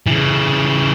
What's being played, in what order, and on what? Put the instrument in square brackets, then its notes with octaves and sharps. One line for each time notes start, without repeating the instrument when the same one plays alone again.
[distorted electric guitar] C#3 E3